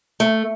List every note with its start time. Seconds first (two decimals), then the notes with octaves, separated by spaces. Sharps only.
0.20 A3